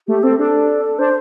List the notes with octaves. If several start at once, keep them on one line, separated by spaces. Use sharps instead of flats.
A3 G4
C4 A4
D4 A4
D4 C5